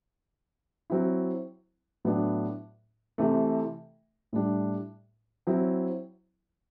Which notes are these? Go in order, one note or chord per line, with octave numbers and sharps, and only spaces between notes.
F#3 C4 E4
A2 F#3 B3 D4
C3 E3 A3
A2 G3 D4
F#3 C4 E4